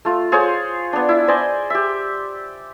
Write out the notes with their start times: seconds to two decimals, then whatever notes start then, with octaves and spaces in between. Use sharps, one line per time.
0.05 A3 F4
0.32 F4 G#4 C5 C#5
0.93 B3 D4
1.09 E4
1.28 C5 D5 D#5 G#5
1.70 G4 E5